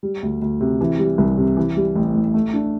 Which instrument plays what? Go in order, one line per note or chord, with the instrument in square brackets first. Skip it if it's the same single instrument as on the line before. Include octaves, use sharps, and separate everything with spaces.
[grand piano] G3
D2
D2
C3
E3
G3
C2
C3
E3
G3
A1
A2
A3
D4